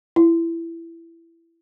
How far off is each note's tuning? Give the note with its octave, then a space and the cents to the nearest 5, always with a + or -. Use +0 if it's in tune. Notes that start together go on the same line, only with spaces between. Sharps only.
E4 +15